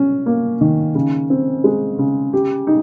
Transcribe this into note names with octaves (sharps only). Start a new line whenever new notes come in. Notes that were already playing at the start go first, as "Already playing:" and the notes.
Already playing: C#4
A#3
D#3
C#3
C4
G#3
C#3
G4
D#4